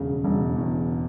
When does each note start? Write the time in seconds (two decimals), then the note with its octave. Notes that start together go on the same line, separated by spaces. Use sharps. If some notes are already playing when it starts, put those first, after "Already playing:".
Already playing: E1 C#3
0.24 E1
0.56 E2